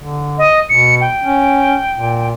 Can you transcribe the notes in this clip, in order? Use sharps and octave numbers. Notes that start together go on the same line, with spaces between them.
D3
D#5
B2 C#7
G5
C#4
A#2